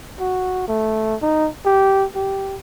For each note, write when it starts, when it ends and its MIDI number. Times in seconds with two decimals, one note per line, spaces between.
0.20 0.64 66
0.68 1.15 57
1.22 1.49 63
1.66 2.06 67
2.15 2.57 67